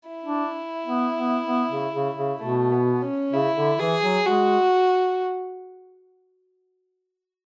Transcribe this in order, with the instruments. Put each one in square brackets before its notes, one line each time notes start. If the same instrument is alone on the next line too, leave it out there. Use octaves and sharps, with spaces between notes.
[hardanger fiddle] E4
[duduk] D4
B3
B3
B3
C#3
C#3
C#3
[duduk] B2 [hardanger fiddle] A3
[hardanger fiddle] B3
C#4
[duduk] C#3 [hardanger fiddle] E4
[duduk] D3
[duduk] E3 [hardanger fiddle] G#4
[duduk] F#3
[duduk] G#3 [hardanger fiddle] F#4